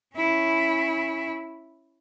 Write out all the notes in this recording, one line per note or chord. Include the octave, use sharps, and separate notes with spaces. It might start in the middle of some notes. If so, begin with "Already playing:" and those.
C#4 E4